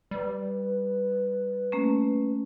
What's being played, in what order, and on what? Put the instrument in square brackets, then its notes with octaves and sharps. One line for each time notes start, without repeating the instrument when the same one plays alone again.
[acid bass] G3 [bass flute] B4
[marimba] A3 A#3 C#4